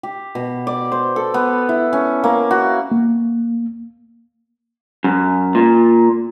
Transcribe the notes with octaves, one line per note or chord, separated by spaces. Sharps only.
G4
B2
D5
C5
A4
B3
E4
C#4
A#3
F#4
A#3
F#2
A#2